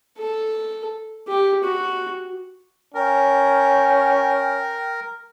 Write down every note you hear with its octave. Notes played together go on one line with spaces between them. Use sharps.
A4
G4
F#4
C#4 A#4 G5